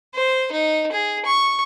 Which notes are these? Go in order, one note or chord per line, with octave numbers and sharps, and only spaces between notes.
C5
D#4
G#4
C#6